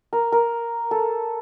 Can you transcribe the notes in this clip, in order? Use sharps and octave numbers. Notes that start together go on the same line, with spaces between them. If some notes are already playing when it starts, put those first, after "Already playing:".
A#4
A#4
A4